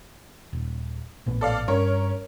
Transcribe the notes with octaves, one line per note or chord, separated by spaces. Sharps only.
D#1
A#1 A2 B3
A4 D5 F5
G2 C#4 A#4 C#5